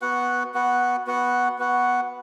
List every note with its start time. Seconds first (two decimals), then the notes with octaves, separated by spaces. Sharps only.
0.02 B3 F#4 B4 F#5
0.54 B3 F#4 B4 F#5
1.07 B3 F#4 B4 F#5
1.58 B3 F#4 B4 F#5